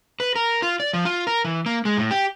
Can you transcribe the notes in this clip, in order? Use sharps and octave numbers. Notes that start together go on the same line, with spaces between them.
B4
A#4
F4
D5
F3
F4
A#4
E3
A#3
G#3
A2
G4